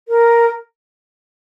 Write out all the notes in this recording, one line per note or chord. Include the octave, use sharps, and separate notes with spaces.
A#4